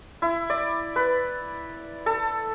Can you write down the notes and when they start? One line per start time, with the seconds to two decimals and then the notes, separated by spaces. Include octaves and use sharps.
0.22 E4
0.50 D5
0.96 B4
2.06 A4